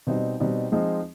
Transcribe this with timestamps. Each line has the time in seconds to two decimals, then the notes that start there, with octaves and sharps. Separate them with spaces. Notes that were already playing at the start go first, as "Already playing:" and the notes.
0.07 B2 G3 C4 D#4
0.40 B2 G3 C4 D#4
0.72 F3 G#3 C4 D#4